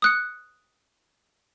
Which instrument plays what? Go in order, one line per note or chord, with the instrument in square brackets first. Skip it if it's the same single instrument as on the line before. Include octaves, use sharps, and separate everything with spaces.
[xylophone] D#6 F#6 C#7